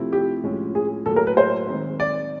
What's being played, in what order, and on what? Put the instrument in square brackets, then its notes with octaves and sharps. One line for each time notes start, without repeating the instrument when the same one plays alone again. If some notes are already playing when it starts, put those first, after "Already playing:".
Already playing: [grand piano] C3 F3 A3 C4 E4
[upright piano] G4
[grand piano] A2 F3 G#3 C#4
[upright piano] G#4
[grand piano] A2 F#3 A#3 [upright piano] A4
[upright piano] A#4
B4
C5
[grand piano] D#3 G#3 C4
[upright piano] D5